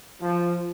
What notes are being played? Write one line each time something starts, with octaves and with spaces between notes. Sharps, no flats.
F3